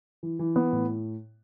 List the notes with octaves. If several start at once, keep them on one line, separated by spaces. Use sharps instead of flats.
E3
E3
B3
A2